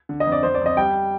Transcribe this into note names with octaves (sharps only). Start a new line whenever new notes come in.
D3
D#5
F2
D5
F2 C5
D5
F2 D#5
G3 G5